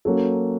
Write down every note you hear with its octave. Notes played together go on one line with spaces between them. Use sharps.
F#3 A#3 C#4 F#4 A4